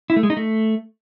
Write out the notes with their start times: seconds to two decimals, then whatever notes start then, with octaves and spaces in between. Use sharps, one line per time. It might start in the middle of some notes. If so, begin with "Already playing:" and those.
0.10 E4
0.16 A3
0.23 G#3
0.30 D#4
0.37 A3